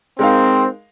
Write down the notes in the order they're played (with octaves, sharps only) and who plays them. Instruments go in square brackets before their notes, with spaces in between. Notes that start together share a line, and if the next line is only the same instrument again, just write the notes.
[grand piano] G#3 D#4 A#4 F5 [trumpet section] C4